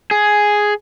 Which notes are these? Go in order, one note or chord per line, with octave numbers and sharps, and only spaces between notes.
G#4